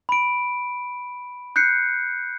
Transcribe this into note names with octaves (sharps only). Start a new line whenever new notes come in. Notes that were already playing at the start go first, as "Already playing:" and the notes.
B5 D7
F#6 G6 C7 C#7